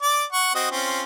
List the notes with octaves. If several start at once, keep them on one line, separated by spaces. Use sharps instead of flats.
D5 D6
F#5 C#6
C4 F#4 D#5
C4 C#4 F4